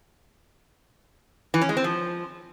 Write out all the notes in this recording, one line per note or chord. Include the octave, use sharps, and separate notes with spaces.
E3
C#4
G#3
C4
F3